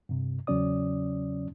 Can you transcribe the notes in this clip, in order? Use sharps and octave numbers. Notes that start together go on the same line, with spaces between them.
G2 C3
E2 C#3 F#3 C#4 D5 D#6